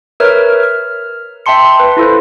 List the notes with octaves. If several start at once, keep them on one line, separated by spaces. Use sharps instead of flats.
A#4 B4 C#5 E5 F6
F6
E5 G5 A5 C6 C#7
B4
E4 F4 A4 C5